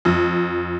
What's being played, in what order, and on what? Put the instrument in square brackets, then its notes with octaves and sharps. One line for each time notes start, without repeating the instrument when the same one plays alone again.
[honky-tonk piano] F2